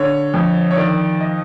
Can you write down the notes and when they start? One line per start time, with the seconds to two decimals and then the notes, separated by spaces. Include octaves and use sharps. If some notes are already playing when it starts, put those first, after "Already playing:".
Already playing: D3 C#5
0.34 F2
0.70 C#5
0.76 D#3 D5
1.20 D#5